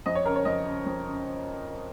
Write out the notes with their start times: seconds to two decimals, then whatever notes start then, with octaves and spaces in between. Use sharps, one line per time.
0.06 F2 D#5
0.15 C#5
0.26 C#3 A#4
0.35 C#5
0.45 F2 D#5
0.65 C#3
0.86 F2
1.05 C#3